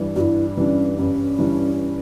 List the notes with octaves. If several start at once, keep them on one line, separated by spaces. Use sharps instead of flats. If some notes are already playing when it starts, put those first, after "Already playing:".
Already playing: G2 E3 G3 D4
G2 E4 F#4
E3 G3 C#4 D4
G2 C#4
E3 G3 D4